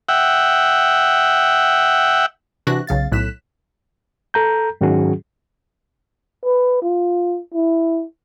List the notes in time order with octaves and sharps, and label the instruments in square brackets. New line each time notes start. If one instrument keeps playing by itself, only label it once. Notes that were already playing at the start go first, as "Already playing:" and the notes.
[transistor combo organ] E5 F#5 G5
[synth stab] C3 E3 D4 F#4 F#6 A#6
B1 C#3 F5 A6
B1 A2 F#6 B6 E7
[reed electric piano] A4 A#5 G6
G#2 D#3 F#3 C#4 F#4 G#4
[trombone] B4
F4
E4